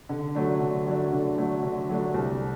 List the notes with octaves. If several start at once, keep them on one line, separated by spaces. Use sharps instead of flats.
D3
F#3 A3 D4
D3
F#3 A3 D4
D3
F#3 A3 D4
D3
F#3 A3 D4
C2